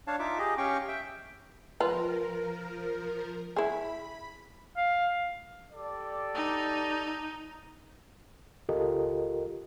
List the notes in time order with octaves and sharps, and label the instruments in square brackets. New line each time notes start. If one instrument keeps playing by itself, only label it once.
[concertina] D4 C#5 F5 A5
D#4 F4 E5 D6
G4 G#4 D#5
C#4 G4 F5 G5 C#6
E5 G5
[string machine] F3 A#4 [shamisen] F4 B4
[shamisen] E4 G#4 [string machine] B5
[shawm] F5
[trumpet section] G4 A4 D5
[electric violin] D#4
[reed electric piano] C#2 F4 G4 A4 A#4 D#5